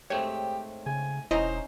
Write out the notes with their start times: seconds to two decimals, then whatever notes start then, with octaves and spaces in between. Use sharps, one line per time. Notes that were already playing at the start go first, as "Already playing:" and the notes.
0.10 G#2 A3 C4 G4 C#5
0.86 C#3 G#5
1.31 E1 C#4 D#4 E4 C5 D#5 A#5